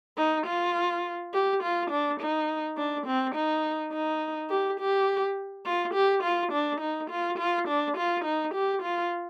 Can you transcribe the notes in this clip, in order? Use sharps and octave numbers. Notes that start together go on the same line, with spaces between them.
D#4
F4
G4
F4
D4
D#4
D4
C4
D#4
D#4
G4
G4
F4
G4
F4
D4
D#4
F4
F4
D4
F4
D#4
G4
F4